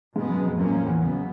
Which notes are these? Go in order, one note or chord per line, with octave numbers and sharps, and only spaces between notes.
G#2 B2 G#3 B3
F#2
F2
F#2 A2 F3 A#3 C#4
F2
E2
C#2 C#3 F#3 B3